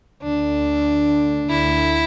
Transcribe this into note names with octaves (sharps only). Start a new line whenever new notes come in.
D2 D3 D4
D2 D3 E4